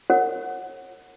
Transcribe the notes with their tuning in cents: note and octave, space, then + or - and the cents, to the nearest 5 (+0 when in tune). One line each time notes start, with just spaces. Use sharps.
A#4 -20 C#5 -35 F#5 -5